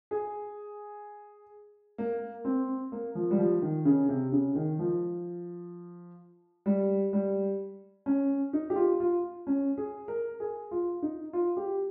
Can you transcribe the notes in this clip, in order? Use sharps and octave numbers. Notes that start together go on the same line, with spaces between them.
G#4
A#3
C4
A#3
F3
G3
F3
D#3
C#3
C3
C#3
D#3
F3
G3
G3
C#4
D#4
G4
F4
F4
C#4
G#4
A#4
G#4
F4
D#4
F4
G4